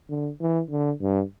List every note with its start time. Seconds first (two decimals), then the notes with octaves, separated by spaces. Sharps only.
0.10 D3
0.40 E3
0.70 D3
1.01 G2